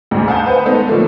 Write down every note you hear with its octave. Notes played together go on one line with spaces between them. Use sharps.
D2 G#2
F5 F#5 G#5 A5 D#6 G6
B4 C5 F#5
G#3 A3 B3 D#4 A4
D3 F3 A3 A#3